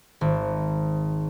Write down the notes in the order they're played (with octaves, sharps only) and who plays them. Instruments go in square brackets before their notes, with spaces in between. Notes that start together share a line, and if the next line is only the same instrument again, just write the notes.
[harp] G#1